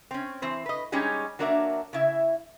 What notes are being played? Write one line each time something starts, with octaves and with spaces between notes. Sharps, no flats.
C4 C#4
E3 C4 C5
B4 D#5
G3 G#3 C#4 D#4 G4 G#4
F#3 A#3 D4 A#4 C#5 E5
C#3 E4 E5